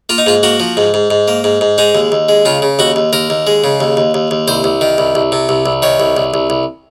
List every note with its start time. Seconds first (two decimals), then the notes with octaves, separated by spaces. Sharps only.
0.09 A#3 F4
0.18 D#4
0.26 G#2 F4
0.43 A#3 F#4
0.60 F3
0.77 G#2
0.94 G#2
1.10 G#2
1.28 A#3
1.44 G#2
1.61 G#2
1.78 G#3 D#4
1.95 D#2
2.12 D#2
2.29 G#3
2.45 C#3 F4
2.62 C#3
2.79 D#2 F#4
2.96 D#2
3.13 D#2 A#4
3.30 D#2
3.47 G#3
3.64 C#3
3.80 D#2
3.97 D#2
4.14 D#2
4.31 D#2
4.48 C2 C5
4.64 C2
4.81 D#3
4.98 C2
5.15 C2
5.32 C3
5.49 C2
5.66 C2
5.82 D#3 C#5
6.00 C2
6.17 C2
6.34 C2
6.50 C2